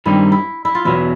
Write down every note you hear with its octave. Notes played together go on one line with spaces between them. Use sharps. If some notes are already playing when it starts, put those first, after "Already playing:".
G2 D#3 G3 C4 D#4 E4
E4
E4
F4
E2 B2 F#3 E4